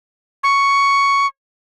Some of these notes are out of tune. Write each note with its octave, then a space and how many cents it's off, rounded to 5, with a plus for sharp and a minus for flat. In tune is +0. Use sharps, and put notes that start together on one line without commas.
C#6 +5